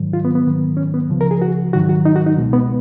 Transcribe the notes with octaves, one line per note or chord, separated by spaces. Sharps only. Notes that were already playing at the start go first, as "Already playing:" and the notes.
Already playing: G#2 D#3 F#3
F4
B3
B3
G#2 D#3 F#3
C#4
B3
C#2 C#3 F3
A#4
G#4
F#4
G#2 D#3 F#3 F#4
F#4
D#4
F#4
D#4
C#2 B2 G#3
B3